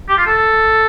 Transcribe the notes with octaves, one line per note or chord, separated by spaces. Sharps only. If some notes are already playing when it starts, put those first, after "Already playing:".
G4
F4
A4